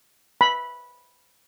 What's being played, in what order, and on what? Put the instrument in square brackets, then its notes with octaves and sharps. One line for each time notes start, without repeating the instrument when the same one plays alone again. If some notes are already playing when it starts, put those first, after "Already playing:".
[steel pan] B5